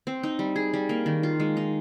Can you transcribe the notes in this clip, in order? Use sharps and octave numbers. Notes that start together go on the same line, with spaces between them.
C4
D#4
G3
G#4
G3
A#3
D#3
F4
G#3
D#4